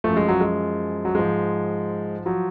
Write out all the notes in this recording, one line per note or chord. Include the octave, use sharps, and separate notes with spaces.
F#2 F3 A3
G#3
F#3
G#3
F#3
G#2 F3 G#3
F3 F#3